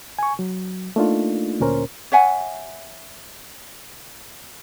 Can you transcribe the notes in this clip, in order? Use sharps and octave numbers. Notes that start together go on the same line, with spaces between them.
G#5 C#6
F#3
A3 A#3 D4 D#4 F4
D2 A#2 C#4 A#4 C5
C#5 E5 F#5 G#5